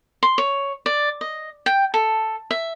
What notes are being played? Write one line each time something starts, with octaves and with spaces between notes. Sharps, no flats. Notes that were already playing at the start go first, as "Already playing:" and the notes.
C6
C#5
D5
D#5
G5
A4
E5